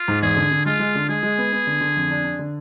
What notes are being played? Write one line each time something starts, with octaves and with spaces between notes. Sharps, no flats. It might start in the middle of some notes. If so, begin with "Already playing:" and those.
Already playing: F4
G#2
E2 G#4
D3
D3
G#3 F4
G#3
D3
G#3 G#4
G#3
B3
B3
D3
D3
F2
D4
D4
D3